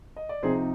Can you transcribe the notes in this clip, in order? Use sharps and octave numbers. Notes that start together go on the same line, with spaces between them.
D#5
D5
C3 F3 C4 D#4 G#4 C5